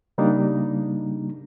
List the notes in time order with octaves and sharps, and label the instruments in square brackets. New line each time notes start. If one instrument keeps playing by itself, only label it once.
[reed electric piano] C#3 G3 A#3 D4 D#4